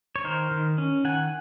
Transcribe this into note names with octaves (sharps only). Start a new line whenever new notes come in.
C#5
D#3 A#4 C5
D#3
C#4
D#3 F#5 G#5